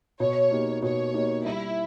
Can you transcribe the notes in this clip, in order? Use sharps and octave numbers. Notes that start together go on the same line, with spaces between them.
B2 C#5
A#3 D#4 G4
B2 C#5
A#3 D#4 G4
G3 E4